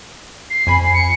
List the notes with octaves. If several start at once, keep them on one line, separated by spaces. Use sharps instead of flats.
C7
F2 G#5 B5
C#7